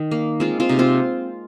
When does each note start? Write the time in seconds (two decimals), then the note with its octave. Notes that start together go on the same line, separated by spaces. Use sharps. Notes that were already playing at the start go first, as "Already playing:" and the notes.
Already playing: D#3
0.11 A#3
0.40 G#3 C4 F4
0.60 C4 F4
0.69 C3 D#4
0.79 C4 F4